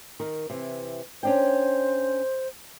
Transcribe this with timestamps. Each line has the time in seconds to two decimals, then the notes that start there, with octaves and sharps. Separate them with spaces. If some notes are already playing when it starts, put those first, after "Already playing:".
0.20 D#3 A#4
0.50 C3 E3
1.23 C#4 D4 C5 G5